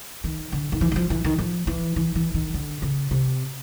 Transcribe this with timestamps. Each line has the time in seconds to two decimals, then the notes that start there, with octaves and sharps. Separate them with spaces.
0.24 D#3
0.52 D3
0.72 D#3
0.81 E3
0.92 E3
0.96 F3
1.10 E3
1.25 D#3
1.38 F3
1.67 E3
1.96 E3
2.15 E3
2.34 D#3
2.54 D3
2.82 C#3
3.11 C3